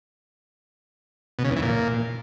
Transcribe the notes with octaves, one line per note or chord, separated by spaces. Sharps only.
B2
C#3
E2
E3
A#2